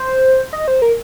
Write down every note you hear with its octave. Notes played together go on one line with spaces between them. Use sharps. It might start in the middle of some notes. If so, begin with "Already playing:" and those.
Already playing: C5
D#5
C5
A#4